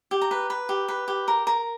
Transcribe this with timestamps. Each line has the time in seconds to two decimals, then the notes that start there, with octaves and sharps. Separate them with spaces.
0.11 G4
0.22 A#5
0.31 B4
0.50 B4
0.69 G4
0.88 B4
1.08 G4
1.28 A#4
1.47 A#4